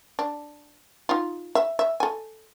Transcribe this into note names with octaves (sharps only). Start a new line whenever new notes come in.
D4
D#4 F4
E5
E5
A4 G#5